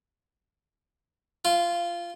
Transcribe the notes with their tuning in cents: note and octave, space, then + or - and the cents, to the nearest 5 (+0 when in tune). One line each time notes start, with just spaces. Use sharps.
F4 -15